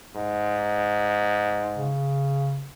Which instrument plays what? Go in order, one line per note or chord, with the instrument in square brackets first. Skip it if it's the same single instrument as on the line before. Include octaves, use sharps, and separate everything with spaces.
[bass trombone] G#2
[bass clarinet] C#3